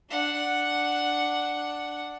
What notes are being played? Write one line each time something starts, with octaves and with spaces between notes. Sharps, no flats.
D4 F#5